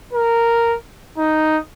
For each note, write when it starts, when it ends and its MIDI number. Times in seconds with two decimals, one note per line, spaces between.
0.13 0.76 70
1.18 1.57 63